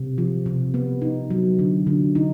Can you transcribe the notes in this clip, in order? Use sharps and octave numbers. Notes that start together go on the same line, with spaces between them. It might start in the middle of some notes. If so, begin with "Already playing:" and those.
Already playing: C3
F3
C3
B3
D#4
F#3
D3
D3
D#4